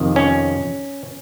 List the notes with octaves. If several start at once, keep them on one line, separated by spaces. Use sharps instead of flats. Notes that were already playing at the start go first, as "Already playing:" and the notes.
Already playing: F2 C3 D#3
C#4